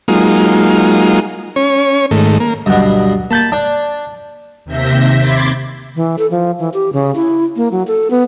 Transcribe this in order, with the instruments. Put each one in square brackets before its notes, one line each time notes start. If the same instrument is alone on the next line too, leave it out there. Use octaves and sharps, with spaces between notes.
[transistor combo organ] F#3 G#3 A#3 D#4 F4
C#4 C#5
G#2 D#3 A3
A#3
[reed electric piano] D2 F#3 F#5 [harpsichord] G2 B2
[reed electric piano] A#3 G6 A6 [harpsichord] A5 B5
[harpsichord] D4 [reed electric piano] A5
[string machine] D#2 C3 E5 G6 A#6 B6
B5 C6 D6 G#6 A6
[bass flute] E3
A4
F3
E3
G4
C#3
E4
A#3
F#3
A4
B3